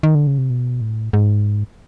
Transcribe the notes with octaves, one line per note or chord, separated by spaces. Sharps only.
D#3
D3
C#3
C3
B2
A2
G#2